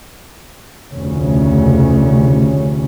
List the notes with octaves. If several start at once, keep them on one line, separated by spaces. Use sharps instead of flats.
F1 D2 C#3 C#4